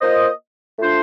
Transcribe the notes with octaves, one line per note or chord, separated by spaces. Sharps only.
A#3 F4 C5 D#5
A3 D4 F4 C5